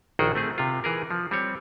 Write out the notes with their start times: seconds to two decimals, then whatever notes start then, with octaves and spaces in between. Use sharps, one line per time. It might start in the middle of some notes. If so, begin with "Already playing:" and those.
0.19 A#1 D#3 F#4 G#4 G5
0.35 A3 C4 G#4
0.58 C3 F4
0.84 E3 G#4 A#4
1.11 F3
1.31 G3 C4 C#5